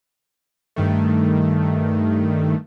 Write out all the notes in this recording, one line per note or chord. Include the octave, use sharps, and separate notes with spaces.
G2 D#3 A3